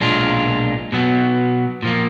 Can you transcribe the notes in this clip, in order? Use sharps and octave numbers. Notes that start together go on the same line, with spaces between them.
B1 A#2 G#3 D4 F4
B2 F#3 B3
A#2 F3 A#3